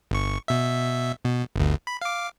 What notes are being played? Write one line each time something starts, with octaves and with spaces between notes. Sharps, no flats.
G1 C#6
B2 E5
B2
G1 D2
B5
F5 D6